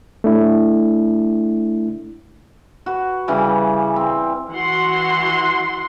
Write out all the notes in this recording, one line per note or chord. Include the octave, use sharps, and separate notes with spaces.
A3 D4 E4
F#4 B4
C#3 E3 G3
C4
E3 F#4 F#5 C6